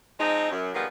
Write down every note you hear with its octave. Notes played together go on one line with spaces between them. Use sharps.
F3 G#3 C4 D#4
F#2
D#3 F3 G3 G#3 A#3 B3